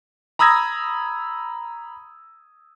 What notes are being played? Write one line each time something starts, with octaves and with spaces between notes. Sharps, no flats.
A#5 B5 D#6 E6 G#6 A#6